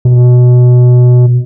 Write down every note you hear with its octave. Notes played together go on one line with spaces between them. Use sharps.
B2